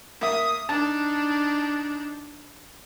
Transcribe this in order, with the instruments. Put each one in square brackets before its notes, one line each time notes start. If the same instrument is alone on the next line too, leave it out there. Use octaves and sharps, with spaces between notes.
[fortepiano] A#3 E5 [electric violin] D#6
[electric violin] D4 D#4 [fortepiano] A5